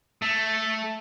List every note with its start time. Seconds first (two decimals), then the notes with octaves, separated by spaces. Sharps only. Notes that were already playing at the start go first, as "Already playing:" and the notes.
0.22 A3